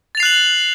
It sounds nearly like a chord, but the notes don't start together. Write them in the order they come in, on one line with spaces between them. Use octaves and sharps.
A6 F7 C7 F#6 F#7